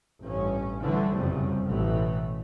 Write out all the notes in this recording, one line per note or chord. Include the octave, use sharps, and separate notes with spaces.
A1 G2 C#4
D3 E3 G3 A3
F#1 F2 C3 G3
A1 B2 E3 A3